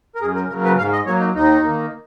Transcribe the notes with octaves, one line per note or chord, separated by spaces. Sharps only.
A#4
F#2 G#4
A#4
C#3 F#3 A#3 A#4
B4
G#2 F5
D#5
F#3 A#3 C#5
D#4
D#2 D#4
D#3 A#3